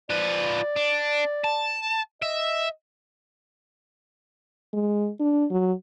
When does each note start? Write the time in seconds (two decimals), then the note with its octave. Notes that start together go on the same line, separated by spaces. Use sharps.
0.10 F3 B4 D5
0.76 D4
1.44 A5
2.22 D#5 E5
4.74 G#3
5.20 D4
5.51 F#3